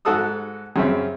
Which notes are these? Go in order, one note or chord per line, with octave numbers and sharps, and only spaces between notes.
G#2 F#4 A4 A5 D#6 E6
F#2 C#3 C4 E5